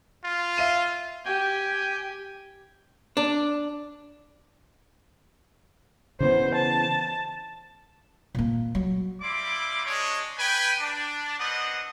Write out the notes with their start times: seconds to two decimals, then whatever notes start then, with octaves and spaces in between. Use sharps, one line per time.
0.24 F4
0.58 E5 F5 D#7
1.25 G4 G5 G#5
3.17 D4
6.20 C#3 E3 B3 C5
6.55 A5
8.35 A#2 A#3
8.75 F#3
9.22 G3 A#3 E4 D5 C6 D6
9.86 G#3 D4 C#5
10.38 B4 G5 G#5
10.80 D4
11.39 B3 C4 D4 D#5 F#5 D#6